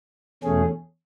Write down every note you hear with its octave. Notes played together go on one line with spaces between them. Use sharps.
E2 B2 A3 C#4 G#4